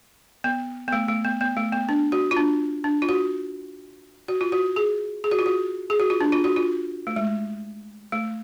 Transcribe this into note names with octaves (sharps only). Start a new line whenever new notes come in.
B3
B3
A3
A3
B3
B3
A3
B3
D4
F#4
F4
D4
D4
F4
F#4
F#4
F4
F#4
G#4
G#4
F#4
F4
F#4
G#4
F#4
F4
D4
F4
F#4
F4
A3
G#3
A3